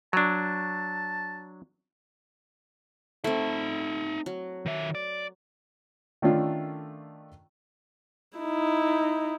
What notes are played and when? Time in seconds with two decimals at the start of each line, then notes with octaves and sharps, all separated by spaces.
0.13 F#3 D4 A5
3.24 A3 C4 D#4 E5
4.26 F#3
4.66 D#3 E5
4.95 D5
6.22 D#3 A3 C#4 D4 F4
8.38 D#4 E4